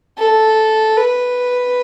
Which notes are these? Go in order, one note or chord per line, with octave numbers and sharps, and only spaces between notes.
A4
B4